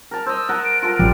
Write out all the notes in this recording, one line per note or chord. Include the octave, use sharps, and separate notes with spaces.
A#4 A5
C5 D#5 E6
A#4 F#5 A5
D7
F4 A4 A#4 D7
A1 F3 G3